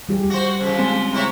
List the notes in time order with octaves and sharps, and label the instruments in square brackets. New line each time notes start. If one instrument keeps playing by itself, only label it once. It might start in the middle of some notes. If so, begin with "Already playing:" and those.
[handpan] G3 G4 G#4
[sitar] F#4 C5
C#3 F3
[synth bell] G#3 C4
[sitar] C3 E4 C#5